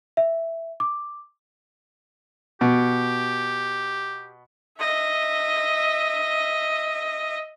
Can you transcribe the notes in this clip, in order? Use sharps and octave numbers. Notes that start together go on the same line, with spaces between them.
E5
D6
B2 G4
D#5 E5